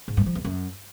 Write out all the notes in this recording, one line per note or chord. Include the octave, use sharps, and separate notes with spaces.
G#2
G2
F3
E2
F#2